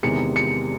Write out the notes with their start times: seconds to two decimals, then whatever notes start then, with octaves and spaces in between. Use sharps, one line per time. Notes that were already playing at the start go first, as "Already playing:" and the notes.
0.03 E2 C3 D#3 G#3 C#7
0.36 C#7